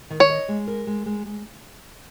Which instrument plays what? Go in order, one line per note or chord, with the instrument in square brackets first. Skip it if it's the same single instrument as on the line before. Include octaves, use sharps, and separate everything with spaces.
[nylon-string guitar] D#3
[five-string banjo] C#5
[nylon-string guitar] D#5
G#3
A#4
G#3
G#3
G#3